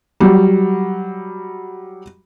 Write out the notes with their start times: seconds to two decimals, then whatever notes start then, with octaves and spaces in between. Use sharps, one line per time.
0.20 F#3 G3